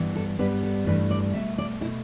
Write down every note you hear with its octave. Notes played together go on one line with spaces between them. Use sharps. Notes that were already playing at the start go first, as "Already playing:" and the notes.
Already playing: G2 E3 B3
A4
G2 G3 B3 B4
A4
G2 E3 A3 B4
D5
B2 A3 E5
D5
B2 A3 E4